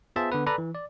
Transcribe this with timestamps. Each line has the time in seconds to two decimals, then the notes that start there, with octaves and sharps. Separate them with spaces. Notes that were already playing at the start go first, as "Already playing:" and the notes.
0.16 B3 F4 G#4 C5 E5 A5
0.32 D3 B3 B4
0.46 A4 B4 D5 A#5 B5
0.58 E3
0.75 D5